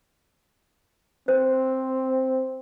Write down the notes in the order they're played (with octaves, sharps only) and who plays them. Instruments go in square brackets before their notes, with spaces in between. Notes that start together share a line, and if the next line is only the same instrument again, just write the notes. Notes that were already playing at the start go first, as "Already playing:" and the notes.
[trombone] C4 [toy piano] C5